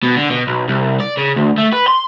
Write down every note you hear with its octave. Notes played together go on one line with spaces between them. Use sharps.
B2
D3
B2
B1
C2
D5
C#3
D2
A3
B4
C6